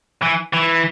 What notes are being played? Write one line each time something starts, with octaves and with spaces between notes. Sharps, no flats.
E3
E3